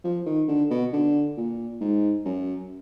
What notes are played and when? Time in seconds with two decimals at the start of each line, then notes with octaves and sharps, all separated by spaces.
0.04 F3
0.26 D#3
0.48 D3
0.71 B2
0.93 D3
1.37 A#2
1.81 G#2
2.25 F#2